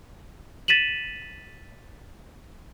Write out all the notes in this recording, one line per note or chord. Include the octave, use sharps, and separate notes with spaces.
A6 B6 D#7 E7 F#7